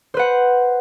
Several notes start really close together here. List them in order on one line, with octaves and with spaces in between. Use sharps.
C5 B4 F#5